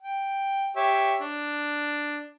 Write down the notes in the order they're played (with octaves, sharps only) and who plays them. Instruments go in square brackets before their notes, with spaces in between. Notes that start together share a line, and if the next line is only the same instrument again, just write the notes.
[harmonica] G5
G4 C#5 E5
D4